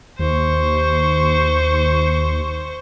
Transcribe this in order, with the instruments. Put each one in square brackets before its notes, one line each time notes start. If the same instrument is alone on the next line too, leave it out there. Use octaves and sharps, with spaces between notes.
[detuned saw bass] D#2 [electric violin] C5 C#6